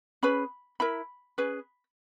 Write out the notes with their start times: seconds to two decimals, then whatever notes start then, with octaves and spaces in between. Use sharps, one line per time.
0.23 C#4 G#4 B4 B5
0.80 E4 A#4 B5
1.38 C#4 G#4 B4